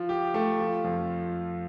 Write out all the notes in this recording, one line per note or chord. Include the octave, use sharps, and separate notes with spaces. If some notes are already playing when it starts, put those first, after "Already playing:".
Already playing: F3
G4
A3
F3
F2